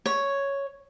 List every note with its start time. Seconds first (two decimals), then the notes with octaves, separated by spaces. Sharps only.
0.06 C#5